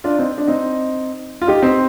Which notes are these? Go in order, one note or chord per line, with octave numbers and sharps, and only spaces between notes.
D4 F4
C4 D#4
D4
C4 D#4
F4
D#4 G4
C4 D#4